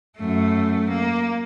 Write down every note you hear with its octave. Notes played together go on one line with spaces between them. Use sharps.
F#2 A3
A#3